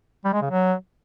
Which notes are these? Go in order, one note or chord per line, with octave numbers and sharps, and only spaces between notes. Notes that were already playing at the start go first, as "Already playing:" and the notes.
G3
G#3
C#3
F#3